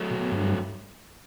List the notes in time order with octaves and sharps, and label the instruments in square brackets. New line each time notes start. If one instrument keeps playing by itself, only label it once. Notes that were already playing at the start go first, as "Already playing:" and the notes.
Already playing: [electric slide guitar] F#3 A3
[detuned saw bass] B2
G2